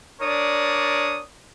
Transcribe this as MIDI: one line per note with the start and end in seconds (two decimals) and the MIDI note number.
0.22 1.23 62
0.22 1.23 70
0.22 1.23 73
0.22 1.23 74
0.22 1.23 87